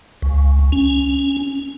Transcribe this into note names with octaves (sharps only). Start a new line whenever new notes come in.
C#2
C#4